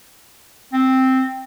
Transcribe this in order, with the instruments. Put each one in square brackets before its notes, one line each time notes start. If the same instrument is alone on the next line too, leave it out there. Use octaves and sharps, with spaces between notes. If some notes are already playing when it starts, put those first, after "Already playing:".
[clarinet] C4